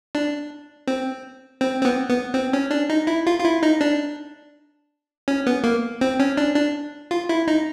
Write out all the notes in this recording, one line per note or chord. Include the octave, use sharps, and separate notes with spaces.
D4
C4
C4
C4
B3
B3
C4
C#4
D4
D#4
E4
F4
F4
E4
D#4
D4
C#4
B3
A#3
C4
C#4
D4
D4
F4
E4
D#4